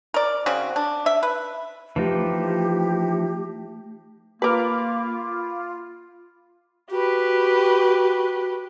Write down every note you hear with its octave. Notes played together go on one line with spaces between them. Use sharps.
A#4 D5
C#3 C4 F#4
D4
E5
B4
E3 F3 A3 D#4 G4
A#3 F4 A#4 B4 B5 D6 F6
F#4 G4 B4